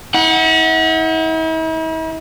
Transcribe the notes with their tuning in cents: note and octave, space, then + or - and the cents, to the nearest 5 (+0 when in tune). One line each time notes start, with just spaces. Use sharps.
E4 -45 F#5 -5